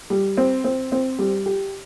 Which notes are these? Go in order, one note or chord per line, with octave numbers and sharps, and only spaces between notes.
G3
C4
C4
C4
G3
G4